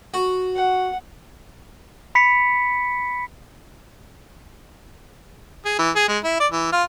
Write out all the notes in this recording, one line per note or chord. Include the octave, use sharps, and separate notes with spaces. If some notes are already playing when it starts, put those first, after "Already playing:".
F#4
F#5
B5 B6 C#7
G#4
E3
G#4
G#3
E4
D5
E3
F4